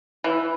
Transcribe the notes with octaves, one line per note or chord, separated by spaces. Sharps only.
E3